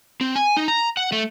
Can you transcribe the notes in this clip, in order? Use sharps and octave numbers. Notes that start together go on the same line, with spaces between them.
C4
G#5
D#4
A#5
F#5
A3